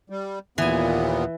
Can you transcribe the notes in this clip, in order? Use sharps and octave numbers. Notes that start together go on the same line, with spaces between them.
G3
D#2 A#2 E3 B3 G#5